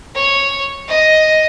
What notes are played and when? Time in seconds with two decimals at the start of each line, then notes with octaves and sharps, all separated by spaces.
0.15 C#5
0.88 D#5